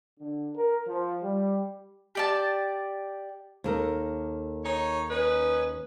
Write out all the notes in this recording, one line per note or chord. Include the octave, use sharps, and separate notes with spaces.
D3
A#4
F3
G3
G4 D5 A5
D#2 A4 A#4
D#4 C#5
C#4 D#4 B4